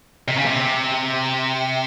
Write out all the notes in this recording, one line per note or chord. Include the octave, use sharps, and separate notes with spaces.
C3
C#3
C3